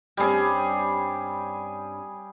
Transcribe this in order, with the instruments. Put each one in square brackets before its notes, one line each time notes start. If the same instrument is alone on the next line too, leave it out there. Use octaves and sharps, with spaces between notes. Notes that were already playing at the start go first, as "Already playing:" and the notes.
[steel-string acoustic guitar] G2 C4 C#4 [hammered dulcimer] G3 G#4